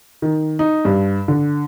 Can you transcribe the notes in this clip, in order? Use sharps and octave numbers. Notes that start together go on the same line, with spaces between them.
D#3
D#4
G2
D3